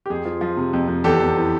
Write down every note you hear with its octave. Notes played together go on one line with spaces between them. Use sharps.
G4
F2 G#4
F3
F3
C3
F2
F2
E2 G4 A4
E2
E3